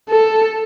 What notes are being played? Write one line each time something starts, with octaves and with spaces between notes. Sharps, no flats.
A4